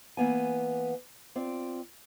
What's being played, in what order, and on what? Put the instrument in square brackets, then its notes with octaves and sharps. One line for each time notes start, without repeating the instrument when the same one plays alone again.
[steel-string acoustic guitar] E3 A#3 B3 G#5
C4 F4 D5